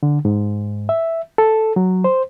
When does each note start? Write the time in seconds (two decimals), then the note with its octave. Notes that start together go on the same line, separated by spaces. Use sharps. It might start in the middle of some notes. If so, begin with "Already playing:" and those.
0.03 D3
0.25 G#2
0.89 E5
1.38 A4
1.76 F#3
2.04 C5